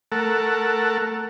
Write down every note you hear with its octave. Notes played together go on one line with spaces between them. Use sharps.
A3 A4 A#4 F#5